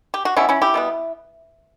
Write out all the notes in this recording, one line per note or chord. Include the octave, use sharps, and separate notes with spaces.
G4
F#4
B2 G3 B3 C#4 E4
C#4 E4
E4 G4
B2 G3 B3